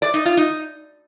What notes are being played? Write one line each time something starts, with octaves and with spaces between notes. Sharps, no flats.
D5
D#4
F4
D#4